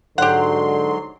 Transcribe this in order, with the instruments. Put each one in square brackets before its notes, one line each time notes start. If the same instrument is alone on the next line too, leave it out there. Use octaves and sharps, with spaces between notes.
[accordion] G#2 F#3 C6 [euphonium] D3 [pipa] G4 F#5